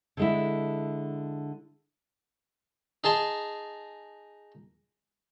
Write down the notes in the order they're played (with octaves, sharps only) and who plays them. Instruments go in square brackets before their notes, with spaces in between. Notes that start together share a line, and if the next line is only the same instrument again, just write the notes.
[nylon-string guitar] D3 G#3 E4
[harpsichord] D#4 G#4 A5 C6